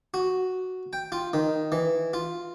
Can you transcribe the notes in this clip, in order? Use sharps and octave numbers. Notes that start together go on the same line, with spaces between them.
F#4
G5
F4
D#3
E3
F4